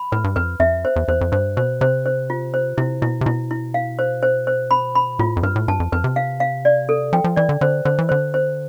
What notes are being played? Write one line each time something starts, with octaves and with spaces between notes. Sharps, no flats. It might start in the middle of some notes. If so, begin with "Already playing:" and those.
Already playing: B5
A2 B4
G2
F2 B4
F2 E5
C5
E2
E2 C5
F2
G2 C5
B2 C5
C3 C5
C5
F4
C5
C3 E4
B2 E4
C3
B2 E4
E4
F5
C5
C5
C5
B5
B5
A2 F4
F2
G2 B4
A2
G2 A5
F2
F2 B4
C3
F5
F5
D5
A4
F3 G5
F3
E3 D5
D3
D3 C5
D3 C5
E3
D3 C5
C5